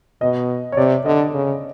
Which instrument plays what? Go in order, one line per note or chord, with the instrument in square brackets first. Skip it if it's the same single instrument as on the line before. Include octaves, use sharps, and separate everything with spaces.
[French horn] B2 [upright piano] D#5
[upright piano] C#5
[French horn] C3 [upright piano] D5
[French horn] D3 [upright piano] D#5
[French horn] C#3